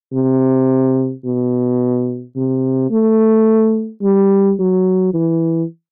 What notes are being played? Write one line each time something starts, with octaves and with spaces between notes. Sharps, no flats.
C3
B2
C3
A3
G3
F#3
E3